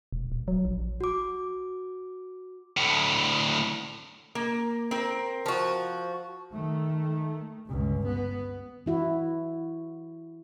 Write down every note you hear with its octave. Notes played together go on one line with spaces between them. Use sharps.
E1
D#1
F#3
A#1
F#4 D6
D2 A2
A#3
C4 A#4
F3 F#4
D#3 A3
G1 C#2
B3
E3 E4 F#4